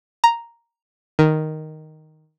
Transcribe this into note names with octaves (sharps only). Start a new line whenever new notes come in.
A#5
D#3